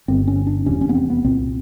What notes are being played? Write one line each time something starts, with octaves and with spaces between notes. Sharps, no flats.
G1 G2 D3 C4
C#4
D4
F1 E2 C3 C#4
C#4
B3
C4
B3
C2 A#2 C4